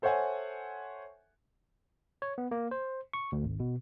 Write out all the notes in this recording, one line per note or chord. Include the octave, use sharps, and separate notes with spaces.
A4 C5 C#5 E5 F#5 G#5
C#5
B3
A#3
C5
C#6
D2
G#1
B2